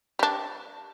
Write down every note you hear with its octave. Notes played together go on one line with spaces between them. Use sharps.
G3 D4